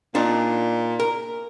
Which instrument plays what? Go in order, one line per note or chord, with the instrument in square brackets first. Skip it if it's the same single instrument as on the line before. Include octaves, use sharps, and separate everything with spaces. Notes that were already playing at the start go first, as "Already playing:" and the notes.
[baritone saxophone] A#2 [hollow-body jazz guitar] D4 D#4
[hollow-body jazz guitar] A#4